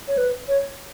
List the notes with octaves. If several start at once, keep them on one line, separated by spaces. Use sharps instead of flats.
C#5
B4
C#5